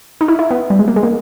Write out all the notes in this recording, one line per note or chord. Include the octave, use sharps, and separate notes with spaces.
D#4
E4
E4
B3
G3
G#3
A#3
G#3
A#3